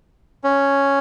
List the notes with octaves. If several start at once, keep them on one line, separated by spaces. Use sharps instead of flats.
C#4